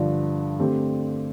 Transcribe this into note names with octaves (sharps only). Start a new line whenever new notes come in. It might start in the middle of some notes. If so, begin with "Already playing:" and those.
Already playing: G2 D3 F3 D4
D3 A3 C4 G4